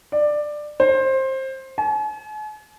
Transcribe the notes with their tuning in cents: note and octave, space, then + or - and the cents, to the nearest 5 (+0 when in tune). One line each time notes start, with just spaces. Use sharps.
D5 +15
C5 +20
G#5 +45